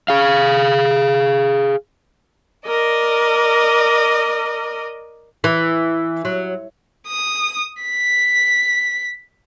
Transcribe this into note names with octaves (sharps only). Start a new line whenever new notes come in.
G#4 F5
A#4 D5 D#5
E3
F#3
D#6
B6